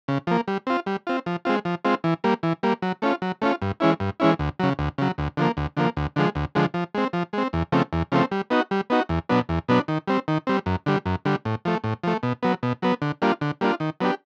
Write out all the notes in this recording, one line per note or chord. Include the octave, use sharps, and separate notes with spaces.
C#3
F3 A#3
G3
C4 F4
G3
C4 F4
F3
G#3 C4 F4
F3
G#3 C4 F4
E3
G3 A#3
E3
G3 A#3
F#3
A3 C#4 F4
F#3
A3 C#4 F4
G2
E3 G#3 C#4 E4
G2
E3 G#3 C#4 E4
D2
C#3 F#3
D2
C#3 F#3
D2
D3 F3 A#3
D2
D3 F3 A#3
D2
D3 F3 G#3
D2
D3 F3 G#3
F3
G#3 C4
F3
G#3 C4
E2
C#3 F3 A3 C4
E2
C#3 F3 A3 C4
G3
B3 D#4 F#4
G3
B3 D#4 F#4
E2
B2 F#3 B3 D4
E2
B2 F#3 B3 D4
D#3
G3 C4
D#3
G3 C4
F#2
D3 G3
F#2
D3 G3
A2
F3 A3
A2
F3 A3
B2
F#3 B3
B2
F#3 B3
D3
G3 A#3 D4 F4
D3
G3 A#3 D4 F4
D#3
F#3 B3 D4 G4